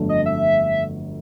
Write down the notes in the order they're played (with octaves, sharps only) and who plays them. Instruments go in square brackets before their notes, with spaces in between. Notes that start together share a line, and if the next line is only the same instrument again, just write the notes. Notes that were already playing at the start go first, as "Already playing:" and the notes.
Already playing: [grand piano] G1 F2 D3 F#3 A3
[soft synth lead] D#5
E5